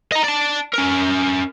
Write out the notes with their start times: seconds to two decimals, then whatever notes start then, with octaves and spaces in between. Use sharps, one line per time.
0.12 D#5 A#5
0.24 D5 A5
0.73 C#4 A#4